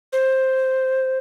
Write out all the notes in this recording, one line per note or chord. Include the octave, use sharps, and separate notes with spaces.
C5